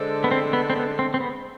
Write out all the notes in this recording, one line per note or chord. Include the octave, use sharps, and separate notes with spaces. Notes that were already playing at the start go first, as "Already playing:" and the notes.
Already playing: D3 G#3 D4 A4 C5
B3
C4
B3
C4
B3
C4
C4
B3